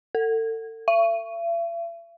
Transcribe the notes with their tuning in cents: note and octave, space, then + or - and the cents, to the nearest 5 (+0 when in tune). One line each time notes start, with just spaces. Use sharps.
A4 +35
E5 +45